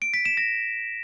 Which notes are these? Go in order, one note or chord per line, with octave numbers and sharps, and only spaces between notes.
D7
B6
E7
A#6